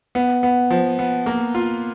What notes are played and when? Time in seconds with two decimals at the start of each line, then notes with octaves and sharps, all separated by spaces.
0.15 B3
0.43 B3
0.70 F3
0.99 B3
1.26 A#3
1.54 F4